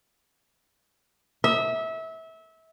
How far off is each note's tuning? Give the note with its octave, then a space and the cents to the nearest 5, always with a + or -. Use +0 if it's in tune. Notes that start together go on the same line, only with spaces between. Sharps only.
E5 -25